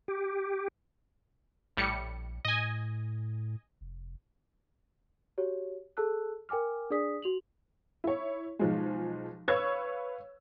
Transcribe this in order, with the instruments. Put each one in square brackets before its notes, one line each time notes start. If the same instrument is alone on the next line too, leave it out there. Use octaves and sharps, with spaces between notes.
[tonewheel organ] G4
[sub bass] A#1 [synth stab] A2 G3 C#7
[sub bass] A2 [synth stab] D#5 G#5
[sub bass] F1
[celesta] F#4 G4 C#5
G#4 A4 A5 E6 F#6
A#4 G5 G#5 D6 F6
D4 G#4 D5 D#6 B6
F#4 F7 F#7
[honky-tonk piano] E4 C#5
B1 F3 G#3
B4 C#5 F5 C#6 E6 G#6